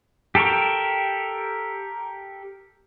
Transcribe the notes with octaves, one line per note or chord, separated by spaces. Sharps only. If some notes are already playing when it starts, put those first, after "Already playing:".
G4 A4 A#4 G5 C#6